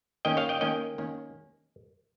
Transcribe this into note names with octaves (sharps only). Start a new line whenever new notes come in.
D#3 A#3 C#4 D#5 G5
C#5 F5
D#5 G5
D#3 A#3 C#4 D#5 G5
D#3 A#3 C#4